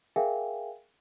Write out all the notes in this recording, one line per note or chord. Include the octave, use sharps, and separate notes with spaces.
G#4 A#4 E5 F5 G5 G#5